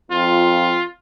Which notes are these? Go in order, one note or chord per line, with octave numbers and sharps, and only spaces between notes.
F2 F4